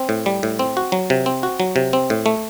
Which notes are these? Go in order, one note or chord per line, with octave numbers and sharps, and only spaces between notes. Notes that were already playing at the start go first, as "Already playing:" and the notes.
Already playing: C4
A2
G3
A2
C4
F#4
F#3
C3
C4
F#4
F#3
C3
C4
A2
A3